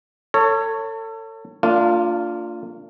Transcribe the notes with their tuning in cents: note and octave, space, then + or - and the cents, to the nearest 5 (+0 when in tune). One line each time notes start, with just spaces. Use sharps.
A4 +35 C#5 +0
A#3 -40 D4 +0 F4 +0